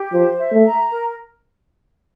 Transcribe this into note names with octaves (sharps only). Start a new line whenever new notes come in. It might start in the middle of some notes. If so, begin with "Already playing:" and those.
Already playing: G4
F3 C5
E5
A3
A#5
A#4